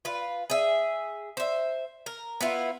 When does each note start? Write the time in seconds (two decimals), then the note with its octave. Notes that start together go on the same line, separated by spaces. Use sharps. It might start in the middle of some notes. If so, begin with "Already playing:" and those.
0.05 F4 B4
0.50 G#4 E5
1.37 C5 E5
2.06 A#4
2.41 B3 E4 F4